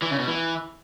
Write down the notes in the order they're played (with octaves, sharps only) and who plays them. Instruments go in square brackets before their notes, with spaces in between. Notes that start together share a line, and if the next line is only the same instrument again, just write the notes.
[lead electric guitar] E3
C#3
B2
E3